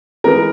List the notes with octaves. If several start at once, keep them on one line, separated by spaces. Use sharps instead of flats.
E3 G#3 B3 A#4